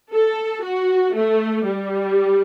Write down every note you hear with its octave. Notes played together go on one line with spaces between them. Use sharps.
A4
F#4
A3
G3